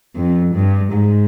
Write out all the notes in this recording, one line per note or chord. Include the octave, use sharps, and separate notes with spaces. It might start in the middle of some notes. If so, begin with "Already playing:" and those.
F2
G2
G#2